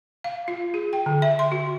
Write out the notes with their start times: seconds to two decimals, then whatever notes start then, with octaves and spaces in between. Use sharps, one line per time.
0.24 F5
0.48 F4
0.74 G#4
0.93 G5
1.06 D3
1.22 E5
1.39 C6
1.52 F#4